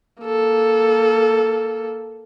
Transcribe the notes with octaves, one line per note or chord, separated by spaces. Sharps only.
A#3 A4